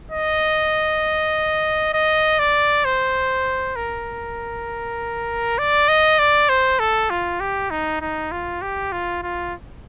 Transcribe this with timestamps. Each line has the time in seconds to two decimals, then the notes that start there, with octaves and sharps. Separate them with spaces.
0.12 D#5
1.94 D#5
2.39 D5
2.85 C5
3.76 A#4
5.58 D5
5.88 D#5
6.19 D5
6.49 C5
6.79 A4
7.10 F4
7.40 G4
7.70 D#4
8.01 D#4
8.31 F4
8.62 G4
8.92 F4
9.23 F4